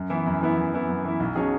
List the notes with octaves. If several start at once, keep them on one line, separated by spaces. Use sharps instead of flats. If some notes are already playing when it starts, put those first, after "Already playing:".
Already playing: F#2
E3 B3 E4
F#2
E3 B3 E4
F#2
E3 B3 E4
F#2
E3 B3 E4
B1
B2 F#3 C#4 G#4